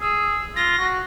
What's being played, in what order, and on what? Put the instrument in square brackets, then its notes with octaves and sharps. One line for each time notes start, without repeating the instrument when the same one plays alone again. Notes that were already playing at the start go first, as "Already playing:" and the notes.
[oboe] G#4 [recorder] E6
[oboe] F4 [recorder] A#6
[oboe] F#4